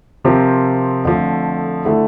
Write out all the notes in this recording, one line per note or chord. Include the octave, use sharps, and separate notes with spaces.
C3 F3 C4 G4 A#4
F2 D3 F3 A3
D3 A3 E4